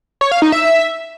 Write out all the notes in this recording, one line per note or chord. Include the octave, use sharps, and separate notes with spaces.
C#5
F5
D#4
E5